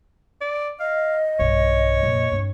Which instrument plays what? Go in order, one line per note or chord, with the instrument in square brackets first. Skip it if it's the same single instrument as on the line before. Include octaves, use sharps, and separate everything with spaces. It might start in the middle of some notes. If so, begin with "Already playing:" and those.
[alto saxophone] D5
[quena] D#5 [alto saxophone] F5
[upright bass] B1 G2 [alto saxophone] C#5
[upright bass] F2 A#2
G2 C4